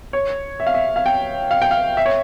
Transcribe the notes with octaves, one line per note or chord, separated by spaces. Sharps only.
C#5
E5
F5
E5
F5
G5
F5
G5
F5
E5
C#5